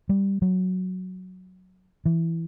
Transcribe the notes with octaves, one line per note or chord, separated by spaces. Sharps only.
G3
F#3
E3